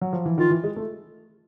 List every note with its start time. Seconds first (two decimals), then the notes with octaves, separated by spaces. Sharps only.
0.01 F#3
0.13 F3
0.26 E3
0.38 D#3 F4
0.50 E3
0.64 G#3
0.76 A3